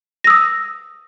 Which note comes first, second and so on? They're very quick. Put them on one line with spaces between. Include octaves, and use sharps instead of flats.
A#6 E6 D#6